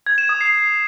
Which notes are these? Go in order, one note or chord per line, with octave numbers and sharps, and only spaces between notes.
G#6
E7
D#6
C7